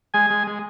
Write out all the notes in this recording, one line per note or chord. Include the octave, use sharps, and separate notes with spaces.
G#3 G#5
G#3
G#3